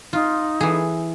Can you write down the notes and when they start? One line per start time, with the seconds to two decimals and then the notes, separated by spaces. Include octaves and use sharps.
0.13 D#4 F4
0.61 E3 G#4